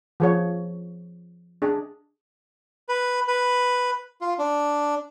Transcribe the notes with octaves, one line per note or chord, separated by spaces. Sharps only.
F3 G#4 C#5
D4 G#4
B4
B4
F4
D4